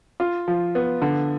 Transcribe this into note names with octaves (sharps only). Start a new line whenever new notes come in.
F4
F3
B3
D3